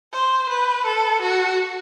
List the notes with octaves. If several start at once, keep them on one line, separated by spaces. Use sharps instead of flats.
C5
B4
A4
F#4